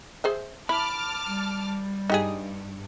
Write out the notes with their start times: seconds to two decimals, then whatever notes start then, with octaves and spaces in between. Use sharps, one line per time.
0.24 G#4 C5 E5
0.69 E4 A5 B5 D6 F6
1.26 G3
2.10 G2 D#4 G4 G#4